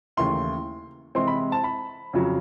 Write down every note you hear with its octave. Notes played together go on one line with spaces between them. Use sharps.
D#2 C#3 E3 A3 C6
C3 E3 G#3 C4 C6
B5
A5
B5
F2 C#3 F#3